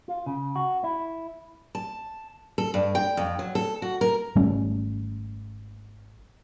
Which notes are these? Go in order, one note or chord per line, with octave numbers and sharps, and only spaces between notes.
F4
C#3
F#4
E4
A5
A4
G2
G5
F2
F#3
A4
F#4
A#4
G#1 G3 A3 C#4